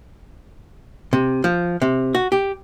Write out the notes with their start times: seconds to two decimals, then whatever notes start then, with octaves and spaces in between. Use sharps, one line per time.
1.13 C3
1.44 F3
1.82 C3
2.15 F#4
2.32 G4